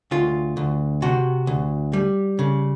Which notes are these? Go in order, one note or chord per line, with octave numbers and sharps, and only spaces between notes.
D2 F4
D2
C3 F#4
D2
G3
C#3